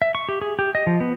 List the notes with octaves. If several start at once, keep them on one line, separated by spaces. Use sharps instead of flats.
E5
C#6
G4
G#4
G4
D#5
F3
B3